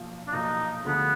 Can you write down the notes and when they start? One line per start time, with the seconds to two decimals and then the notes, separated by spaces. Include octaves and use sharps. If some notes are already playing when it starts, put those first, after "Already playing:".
Already playing: B1 A#2 F3
0.27 D4
0.32 B1 A#2 F3 D#4
0.84 D2 D3 F3 G#3 B3